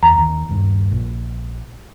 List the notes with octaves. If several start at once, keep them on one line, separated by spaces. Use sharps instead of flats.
E2 A#5
D#2
D#1 G2
A#1